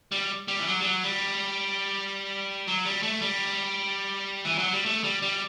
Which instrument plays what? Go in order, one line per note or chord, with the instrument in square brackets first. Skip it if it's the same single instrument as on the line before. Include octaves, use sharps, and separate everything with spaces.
[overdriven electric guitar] G3
G3
E3
F#3
G3
F#3
G3
F#3
G3
A3
G3
E3
F#3
G3
A3
G3
G3